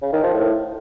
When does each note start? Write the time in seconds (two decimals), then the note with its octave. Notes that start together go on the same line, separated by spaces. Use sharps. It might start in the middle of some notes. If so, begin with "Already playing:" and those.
0.02 C#3
0.13 D#3
0.23 F3
0.34 A2